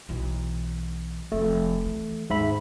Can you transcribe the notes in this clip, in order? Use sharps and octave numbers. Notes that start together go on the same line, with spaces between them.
B1 E3
F1 F3 A3
E3
D#2 G#2 E5 B5